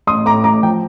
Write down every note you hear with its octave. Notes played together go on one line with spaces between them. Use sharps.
A1 C6 D#6
A2 A#5 D6
A1 A#5 D6
F3 G5